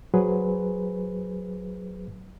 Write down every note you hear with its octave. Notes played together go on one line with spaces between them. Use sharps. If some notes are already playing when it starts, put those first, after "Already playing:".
F#3 G#4 B4 C5